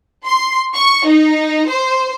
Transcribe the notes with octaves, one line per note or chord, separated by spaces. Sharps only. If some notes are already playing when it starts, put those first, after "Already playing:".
C6
C#6
D#4
C5